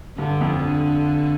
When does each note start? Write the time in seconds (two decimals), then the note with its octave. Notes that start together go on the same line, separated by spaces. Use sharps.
0.18 G2 D3
0.41 F2
0.63 D3